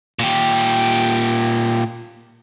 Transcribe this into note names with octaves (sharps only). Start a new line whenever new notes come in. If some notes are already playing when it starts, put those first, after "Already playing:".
A#2 G4